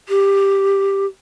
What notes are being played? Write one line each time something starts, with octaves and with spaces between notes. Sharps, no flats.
G4